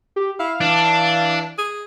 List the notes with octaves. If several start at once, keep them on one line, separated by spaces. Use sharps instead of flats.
G4
E4 F5
E3 D4
G#4